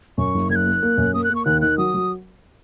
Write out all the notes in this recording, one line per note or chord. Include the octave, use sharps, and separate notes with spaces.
F#2 C#6
F#1
F#1 G#6
F#6
A#3
A#3
F#2
A#3 D#6
F#6
A#3
C#6
D#2 F#6
D#3 F#6
F#3 D#6
F#3